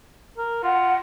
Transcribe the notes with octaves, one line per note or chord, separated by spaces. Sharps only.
A#4
F4 F#5